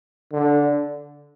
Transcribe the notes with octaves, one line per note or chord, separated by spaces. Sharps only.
D3